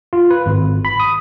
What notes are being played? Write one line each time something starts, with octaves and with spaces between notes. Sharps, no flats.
F4
B4
G#1
B5
D#6